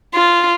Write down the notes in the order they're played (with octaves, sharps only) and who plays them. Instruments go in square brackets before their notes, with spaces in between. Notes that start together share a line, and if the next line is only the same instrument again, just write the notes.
[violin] F4